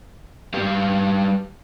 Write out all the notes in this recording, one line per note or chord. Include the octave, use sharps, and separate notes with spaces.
G3 G4 B4 F5